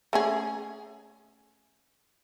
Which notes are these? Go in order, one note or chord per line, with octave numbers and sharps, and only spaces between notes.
A3 C#4 G#4